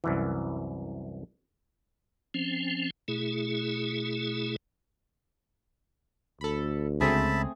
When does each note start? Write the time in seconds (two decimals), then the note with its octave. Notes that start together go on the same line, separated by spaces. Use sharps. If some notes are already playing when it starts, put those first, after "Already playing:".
0.04 C2 F#2 E3
2.34 F3 C4 C#4
3.08 B2 A3 E4 G#4
6.41 D2 A4 B5
7.01 C#2 A3 C4 G#4 E5 A5 B5